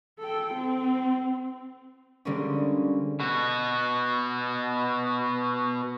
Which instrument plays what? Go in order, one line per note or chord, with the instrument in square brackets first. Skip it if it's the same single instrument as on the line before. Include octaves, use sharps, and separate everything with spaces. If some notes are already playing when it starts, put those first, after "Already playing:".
[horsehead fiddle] A4 G5
C4
[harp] D3 G3 G#3 A#3 C4 C#4
[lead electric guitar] B2 F#4